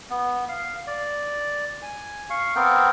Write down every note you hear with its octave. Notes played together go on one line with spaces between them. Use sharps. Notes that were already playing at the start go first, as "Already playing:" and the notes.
B3
F5
D5
G#5
F5 C#6
B3 C4 A#4 G5